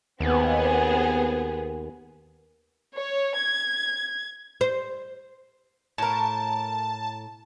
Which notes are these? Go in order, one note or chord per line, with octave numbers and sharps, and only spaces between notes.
D#2 B3 C4 G#4
C#5
G#6
C5
A2 A#4 A5